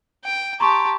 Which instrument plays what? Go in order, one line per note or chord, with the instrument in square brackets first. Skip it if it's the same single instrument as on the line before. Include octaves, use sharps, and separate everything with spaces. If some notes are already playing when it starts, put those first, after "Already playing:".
[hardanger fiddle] G5
[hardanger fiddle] G4 A5 [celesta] A#5 C6 C#6